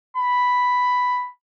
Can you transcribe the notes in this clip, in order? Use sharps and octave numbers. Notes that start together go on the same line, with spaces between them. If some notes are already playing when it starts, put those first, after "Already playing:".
B5